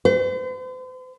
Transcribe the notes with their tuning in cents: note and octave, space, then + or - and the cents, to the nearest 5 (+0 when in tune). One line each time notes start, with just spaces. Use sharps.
C5 -45